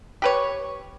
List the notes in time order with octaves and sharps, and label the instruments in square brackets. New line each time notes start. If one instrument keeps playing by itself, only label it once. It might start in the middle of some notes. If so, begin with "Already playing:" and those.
[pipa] G4 B4 C#5